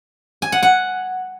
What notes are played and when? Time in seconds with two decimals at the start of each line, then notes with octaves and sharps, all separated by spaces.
0.42 G#5
0.52 F#5
0.63 F#5